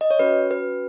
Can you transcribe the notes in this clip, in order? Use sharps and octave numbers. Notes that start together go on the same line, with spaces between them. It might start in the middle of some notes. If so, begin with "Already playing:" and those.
D#5
C#5
C#4 F#4 B4
B4